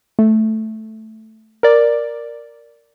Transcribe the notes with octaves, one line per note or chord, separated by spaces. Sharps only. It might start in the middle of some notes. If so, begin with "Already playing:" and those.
A3
A#4 D5